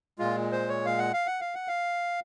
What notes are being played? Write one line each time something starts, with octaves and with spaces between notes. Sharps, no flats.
A#2 G#3 F4
C5
C#5
F5
F#5
F5
F#5
F5
F#5
F5